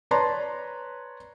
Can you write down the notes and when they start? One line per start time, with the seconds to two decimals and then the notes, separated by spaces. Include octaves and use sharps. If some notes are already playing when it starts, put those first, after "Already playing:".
0.11 B4 C#5 D5 A5 A#5 C6